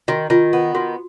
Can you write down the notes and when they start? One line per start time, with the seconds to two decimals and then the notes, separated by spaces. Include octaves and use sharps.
0.08 D#3 F#4
0.30 D#3 F4
0.53 B3
0.75 D#3 F#4